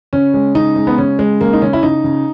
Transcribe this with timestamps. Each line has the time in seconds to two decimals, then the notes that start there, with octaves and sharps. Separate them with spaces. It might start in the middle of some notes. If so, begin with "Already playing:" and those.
0.13 C#3 C#4
0.34 G#3
0.55 C#3 D#4
0.76 G#3
0.87 B3
0.98 C#3 C#4
1.19 G#3
1.41 C#3 A#3
1.53 D#4
1.62 C#3 C#4
1.73 E4
1.83 C#3 D#4
2.04 C#3